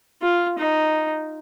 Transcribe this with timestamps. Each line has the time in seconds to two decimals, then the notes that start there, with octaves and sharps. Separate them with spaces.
0.22 F4
0.58 D#4